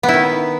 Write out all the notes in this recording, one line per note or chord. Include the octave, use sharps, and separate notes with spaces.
B3
E4
D#3